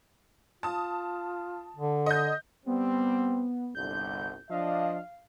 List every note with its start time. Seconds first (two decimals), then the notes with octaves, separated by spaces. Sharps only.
0.63 F4 A5 D#6
1.76 D3
2.06 D#5 G6
2.66 G3 B3 C4
3.75 G1 C2 D3 G6
4.50 F3 D4 D#5 F5